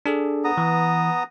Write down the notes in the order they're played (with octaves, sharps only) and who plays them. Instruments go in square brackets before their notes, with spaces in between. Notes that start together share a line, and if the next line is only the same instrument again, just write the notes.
[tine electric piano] D4 G#4 A4
[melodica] B3 A#5 D#6
[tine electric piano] E3